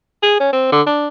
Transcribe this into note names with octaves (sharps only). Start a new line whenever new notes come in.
G#4
C#4
C4
D3
D4